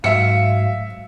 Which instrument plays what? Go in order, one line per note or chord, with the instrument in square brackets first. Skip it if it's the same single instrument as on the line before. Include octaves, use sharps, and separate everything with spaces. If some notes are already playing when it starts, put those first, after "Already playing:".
[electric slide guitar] G#2 F#3 [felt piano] E5 C#7 [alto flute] F5